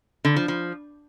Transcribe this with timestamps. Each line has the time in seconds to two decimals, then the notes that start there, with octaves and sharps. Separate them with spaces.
0.25 D3
0.36 F3
0.48 F3